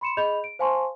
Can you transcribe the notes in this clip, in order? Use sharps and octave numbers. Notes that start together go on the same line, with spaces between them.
B5 C6 C#7 E7
G#4 D#5 B5 G6 F7
D7
C5 F5 G#5 A5 C6 C#6